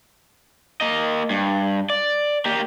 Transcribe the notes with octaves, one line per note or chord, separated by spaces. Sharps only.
A#3 D#5
G2
D5
A#3 G4